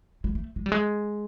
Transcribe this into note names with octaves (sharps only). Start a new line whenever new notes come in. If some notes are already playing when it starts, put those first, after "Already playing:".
G#3
A3
G#3
G3
G#3